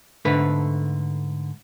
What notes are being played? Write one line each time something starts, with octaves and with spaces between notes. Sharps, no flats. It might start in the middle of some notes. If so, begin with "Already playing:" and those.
G#2 D3 A3 B4